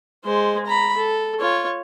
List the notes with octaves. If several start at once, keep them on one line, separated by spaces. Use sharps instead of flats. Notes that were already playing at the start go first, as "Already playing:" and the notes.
G#3 C5
A#5 B5
A4
F4 C#5